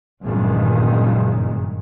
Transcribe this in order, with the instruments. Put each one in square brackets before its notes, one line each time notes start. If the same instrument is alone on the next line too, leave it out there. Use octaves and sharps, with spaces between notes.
[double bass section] F#1 E2 G2 A#2 D#3 G#3